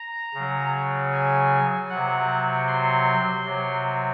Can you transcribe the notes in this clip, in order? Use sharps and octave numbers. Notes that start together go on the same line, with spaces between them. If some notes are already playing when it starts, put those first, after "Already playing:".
Already playing: A#5
C#3 F#3
G#5
F#3 F#5
C3
C6
C3 F#3